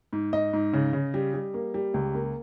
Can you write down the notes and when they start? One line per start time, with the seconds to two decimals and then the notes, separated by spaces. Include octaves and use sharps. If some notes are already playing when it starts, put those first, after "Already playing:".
0.13 G#2
0.33 G#2 D#5
0.53 G#2
0.73 C#3
0.93 C#3
1.14 G3
1.34 G3
1.54 A#3
1.74 G3
1.94 C#2
2.14 A#3